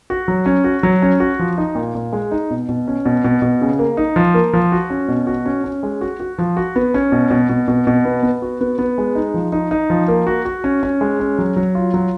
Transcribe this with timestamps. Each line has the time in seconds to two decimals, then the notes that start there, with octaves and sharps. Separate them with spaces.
0.10 F#4
0.28 F#3
0.46 C#4
0.64 F#4
0.83 F#3
1.02 C#4
1.20 F#4
1.39 F3
1.58 D#4
1.75 A#2
1.95 A#2
2.13 G#3
2.31 D#4
2.50 B2
2.69 B2
2.87 C#4
3.06 B2
3.24 B2
3.42 B2
3.61 C#3
3.79 A#3
3.97 D#4
4.16 F3
4.34 A#3
4.53 F3
4.72 F#4
4.90 C#4
5.08 B2
5.27 F#4
5.46 C#4
5.64 C#4
5.83 G#3
6.01 F#4
6.20 F#4
6.38 F3
6.57 F#4
6.76 B3
6.94 C#4
7.12 B2
7.31 B2
7.50 B2
7.68 B2
7.87 B2
8.05 B3
8.23 B3
8.42 F#4
8.61 B3
8.79 B3
8.98 G#3
9.15 D#4
9.34 F3
9.52 D#4
9.71 D#4
9.90 F3
10.08 A#3
10.27 F#4
10.45 F#4
10.64 C#4
10.83 C#4
11.01 G#3
11.20 C#4
11.39 F#3
11.56 F#3
11.75 F4
11.94 F#3